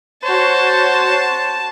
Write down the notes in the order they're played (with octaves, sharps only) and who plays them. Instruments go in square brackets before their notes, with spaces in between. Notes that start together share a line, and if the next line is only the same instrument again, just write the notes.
[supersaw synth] F#4 C#5 [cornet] C5 [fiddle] A5